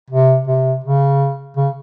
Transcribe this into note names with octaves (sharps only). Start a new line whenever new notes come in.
C3
C3
C#3
C#3